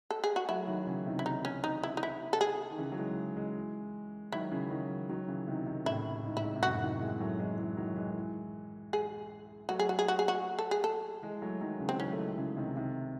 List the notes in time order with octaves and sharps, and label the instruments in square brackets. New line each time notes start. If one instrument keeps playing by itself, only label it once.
[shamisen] A4
G#4
F#4
[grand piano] F#3 A3 [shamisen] E4
[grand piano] D#3 F#3
C#3 E3
C3 D#3
[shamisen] E4
D#4
C#4
D#4
E4
D#4
E4
A4
G#4
[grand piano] D#3
C#3 E3
F#3
E3 G#3
E3 G#3
[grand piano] D#3 F#3 [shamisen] E4
[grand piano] C#3 E3
D#3 F#3
D#3 F#3
C#3 E3
C3 D#3
C3 D#3
[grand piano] A2 C#3 [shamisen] E4
[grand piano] G#2
[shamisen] E4
[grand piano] G#2
C3
[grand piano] F#2 A2 [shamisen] F#4
[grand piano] C3 D#3
E3 G#3
F#3 A3
E3 G#3
E3 G#3
D#3 F#3
E3 G#3
[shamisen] G#4
[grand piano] F#3 A3 [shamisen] F#4
[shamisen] G#4
F#4
G#4
F#4
G#4
F#4
A4
G#4
A4
[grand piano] E3 G#3
F#3 A3
D#3 F#3
C#3 E3
[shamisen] C4
[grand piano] D#3 F#3 [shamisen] C#4
[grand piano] A3
E3 G#3
C#3 E3
C3 D#3
C3 D#3